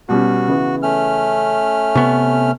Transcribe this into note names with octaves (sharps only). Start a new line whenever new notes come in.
B2 G3 C#4 F#4
C#3 E3 B3
A3 C#4 F6
C3 B3 C#6